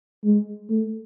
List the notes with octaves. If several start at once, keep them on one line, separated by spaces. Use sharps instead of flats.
G#3
A3